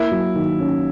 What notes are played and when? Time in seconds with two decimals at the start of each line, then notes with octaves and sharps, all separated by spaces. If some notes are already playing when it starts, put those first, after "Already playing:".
Already playing: A#3 E4
0.11 F#3
0.36 D#3
0.60 C#4